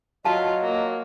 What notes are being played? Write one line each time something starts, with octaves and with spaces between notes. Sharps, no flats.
F#3 F4 F#4 D#5 F5 A5
A#3